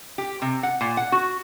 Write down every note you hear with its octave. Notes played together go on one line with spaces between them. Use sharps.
G4
C3
F#5
A#2
F#5
F#4